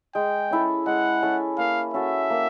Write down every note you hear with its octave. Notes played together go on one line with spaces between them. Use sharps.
G#3 G5
C#4 E4 A4
G#3 F#5
C#4 E4 A4
A#3 F5
C#4 F#4 A4 E5
A#3